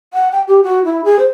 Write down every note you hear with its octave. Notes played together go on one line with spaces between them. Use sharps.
F#5
G5
G4
F#4
E4
G#4
C5